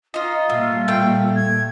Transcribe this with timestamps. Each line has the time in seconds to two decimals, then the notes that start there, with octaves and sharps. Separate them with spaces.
0.14 D#4 F4 D#5
0.50 A#2 G3 A3
0.88 A3 G5
1.36 G#6